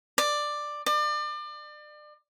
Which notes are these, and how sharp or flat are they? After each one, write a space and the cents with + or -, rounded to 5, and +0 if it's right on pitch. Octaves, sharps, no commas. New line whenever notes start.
D5 +10
D5 +35